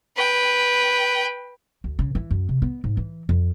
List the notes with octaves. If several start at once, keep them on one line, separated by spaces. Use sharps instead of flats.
B4 G5
D2
C#3
E3
F#2
C3
B3
G#2
E3
F2